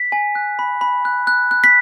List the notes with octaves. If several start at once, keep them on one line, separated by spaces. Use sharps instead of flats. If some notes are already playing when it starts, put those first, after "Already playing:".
Already playing: B6
G#5
F#6
B5
B5
F#6
F#6
F#6
B6